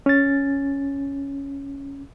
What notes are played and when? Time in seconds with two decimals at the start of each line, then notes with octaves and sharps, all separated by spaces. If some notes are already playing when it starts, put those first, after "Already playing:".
0.06 C#4 A6